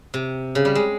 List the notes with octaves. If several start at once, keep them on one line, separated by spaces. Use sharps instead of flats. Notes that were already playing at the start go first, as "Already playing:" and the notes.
C3
C#3
G3
G#3